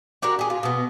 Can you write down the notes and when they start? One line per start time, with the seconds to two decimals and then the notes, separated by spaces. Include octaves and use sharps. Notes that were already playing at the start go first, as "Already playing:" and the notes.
0.22 D4 F#4 G4 A#4
0.39 G4 G#4
0.50 F4
0.63 B2 B3